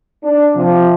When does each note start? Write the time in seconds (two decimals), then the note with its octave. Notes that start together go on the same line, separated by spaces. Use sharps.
0.23 D4
0.55 C3 F3